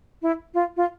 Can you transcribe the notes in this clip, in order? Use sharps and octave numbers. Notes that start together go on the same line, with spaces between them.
E4
F4
F4